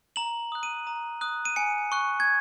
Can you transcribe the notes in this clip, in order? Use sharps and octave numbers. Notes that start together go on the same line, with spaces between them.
A#5 F#7
D#6 F#6
D#7
A#5
D#6 F#6
D#7
G#5 C#7
C#6 F#6
G#6